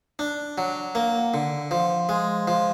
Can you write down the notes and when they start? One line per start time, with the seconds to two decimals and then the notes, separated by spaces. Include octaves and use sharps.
0.19 D4
0.58 F#3
0.95 A#3
1.34 D3
1.71 F3
2.09 G#3
2.48 F3